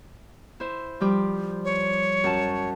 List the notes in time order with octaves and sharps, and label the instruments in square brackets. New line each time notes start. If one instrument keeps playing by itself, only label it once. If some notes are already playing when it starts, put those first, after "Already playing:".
[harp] E4 C5
F3 G3 G4
[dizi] C#5
[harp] F#2 A5